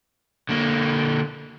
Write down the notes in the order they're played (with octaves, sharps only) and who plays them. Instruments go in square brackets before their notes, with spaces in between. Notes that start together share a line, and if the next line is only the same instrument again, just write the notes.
[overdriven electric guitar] D3 A#3